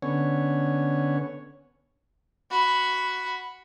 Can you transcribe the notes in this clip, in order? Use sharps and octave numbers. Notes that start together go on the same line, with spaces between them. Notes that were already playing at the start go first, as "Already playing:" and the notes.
D3 B3 C#4 C#5
F#4 B5